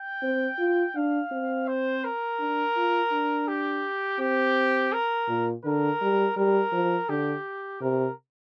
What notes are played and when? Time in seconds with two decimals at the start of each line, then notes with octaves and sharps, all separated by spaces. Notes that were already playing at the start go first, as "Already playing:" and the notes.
Already playing: G5
0.23 C4
0.59 F4
0.96 D4 F5
1.32 C4
1.68 C5
2.04 A#4
2.40 D4
2.76 F4
3.12 D4
3.48 G4
4.20 C4 G4
4.92 A#4
5.29 A#2
5.65 D3 A#4
6.01 G3
6.37 G3 A#4
6.72 F3
7.09 D3 G4
7.81 C3 A#4